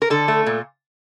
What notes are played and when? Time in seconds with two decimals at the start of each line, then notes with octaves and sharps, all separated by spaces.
0.02 A#4
0.10 D3 A4
0.28 A3
0.46 A#2